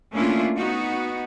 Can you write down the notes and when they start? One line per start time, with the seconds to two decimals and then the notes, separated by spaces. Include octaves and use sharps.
0.13 A3 A#3 C#4 D4 E4 F4
0.56 B3 D#4 F#4